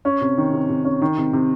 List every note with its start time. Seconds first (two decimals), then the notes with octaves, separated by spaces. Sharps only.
0.05 C#4
0.21 C3
0.38 D#3
0.53 C3
0.69 C3
0.85 C#4
1.02 D#3
1.18 C3
1.33 C3